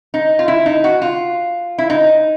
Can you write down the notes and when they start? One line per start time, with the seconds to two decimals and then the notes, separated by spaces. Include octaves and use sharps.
0.14 D#4
0.39 F4
0.48 E4
0.66 D#4
0.84 F#4
1.02 F4
1.78 E4
1.90 D#4